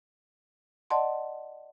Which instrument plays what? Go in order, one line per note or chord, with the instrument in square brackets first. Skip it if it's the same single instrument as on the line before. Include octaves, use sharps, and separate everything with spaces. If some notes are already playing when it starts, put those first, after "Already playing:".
[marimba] D5 D#5 F#5 A5 C6